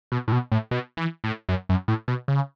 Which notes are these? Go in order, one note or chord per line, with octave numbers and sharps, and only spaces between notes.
B2
A2
B2
A2
B2
E3
A2
F#2
F#2
A2
B2
C#3